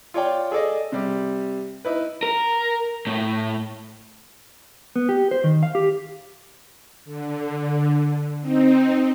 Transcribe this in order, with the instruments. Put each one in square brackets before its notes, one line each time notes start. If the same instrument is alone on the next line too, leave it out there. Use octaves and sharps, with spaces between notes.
[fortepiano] F4 C#5 D5 G5
G#4 A4 D5 D#5
C3 G3
D#4 E4 B4
[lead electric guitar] A#4
A2
[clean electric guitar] B3
G4
C5
D#3
F5
G4
[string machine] D3
C4 D#4